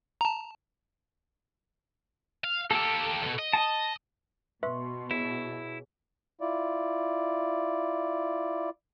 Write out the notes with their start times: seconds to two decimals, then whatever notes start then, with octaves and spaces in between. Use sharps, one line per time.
0.21 A5 A#5
2.44 F5
2.71 A#3 G4 A4
3.22 D2 B2
3.39 D#5
3.53 A5
4.63 B2 B4 E5 C6 C#6
5.11 E4 G#4 C#5
6.41 E4 F4 D5